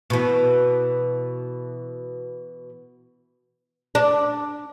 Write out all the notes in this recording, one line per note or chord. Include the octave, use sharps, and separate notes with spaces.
B2 E3
D4